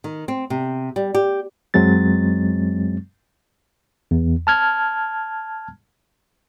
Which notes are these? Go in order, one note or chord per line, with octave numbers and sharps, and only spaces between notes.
D#3
C4
C3
G3
G4
F#2 F#3 G#3 C4 A6
E2
A5 F6 G#6